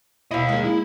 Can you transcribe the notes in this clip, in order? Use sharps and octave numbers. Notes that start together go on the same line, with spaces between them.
B2 E4 D#5 F5
G#3 A#3
E4